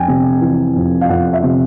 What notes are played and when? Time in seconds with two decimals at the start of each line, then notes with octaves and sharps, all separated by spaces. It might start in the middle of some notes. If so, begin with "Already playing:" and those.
Already playing: F2 G5 G#5
0.08 C3
0.41 E3
0.76 F2
1.01 F5
1.09 F2 F#5
1.33 E5
1.43 C3